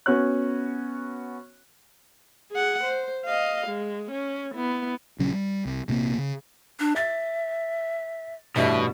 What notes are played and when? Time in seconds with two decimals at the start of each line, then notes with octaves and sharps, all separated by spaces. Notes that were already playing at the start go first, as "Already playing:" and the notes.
0.06 B3 C#4 F#4 C#5 F#6
2.52 G#4 F#5
2.84 C5
3.25 D#5 F5
3.67 G#3
4.12 C#4
4.53 B3 E4
5.19 A#1 C#3 F#3 C#4
5.33 G3
5.65 C2
5.88 A#1 C3 F3 A#3
6.18 C#3
6.80 D4
6.96 E5 A6
8.56 A1 G2 B2 E5